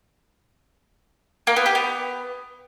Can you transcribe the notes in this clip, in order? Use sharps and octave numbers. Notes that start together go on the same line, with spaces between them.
A#3
B3
G4
B3